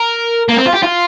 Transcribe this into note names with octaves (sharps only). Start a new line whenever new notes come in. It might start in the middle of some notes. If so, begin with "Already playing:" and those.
Already playing: A#4
A#3
C4
F4
G4
F4